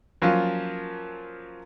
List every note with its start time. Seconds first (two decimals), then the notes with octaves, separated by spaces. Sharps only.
0.22 F3 F#3 A#3 C#4 F4